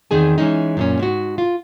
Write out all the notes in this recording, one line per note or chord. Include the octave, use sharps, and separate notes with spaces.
E2 D#3 C4 G#4 G#5
E3 G#3 C#4 D#4
F#2 A#2 C#4
G#2 F#4
F4